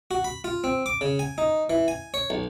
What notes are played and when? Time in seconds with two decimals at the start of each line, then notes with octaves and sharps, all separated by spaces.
0.11 F#4
0.24 B5
0.44 F4
0.64 C4
0.86 D6
1.01 C#3
1.19 G#5
1.38 D#4
1.70 E3
1.88 G#5
2.14 C#5
2.30 B1